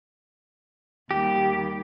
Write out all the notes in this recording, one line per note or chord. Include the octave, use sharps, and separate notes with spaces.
D#2 G3 G4